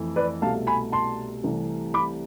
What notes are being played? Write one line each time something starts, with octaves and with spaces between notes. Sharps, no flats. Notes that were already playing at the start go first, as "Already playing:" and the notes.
Already playing: F2 E3 A3
B4 D5
C2 B2 A3 F5 A5
G#5 B5
A5 C6
C2 C3 E3 A3
B5 D6